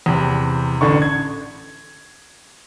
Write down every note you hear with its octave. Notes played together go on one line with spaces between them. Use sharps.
E2 C3
A1 D3 C#6
G#6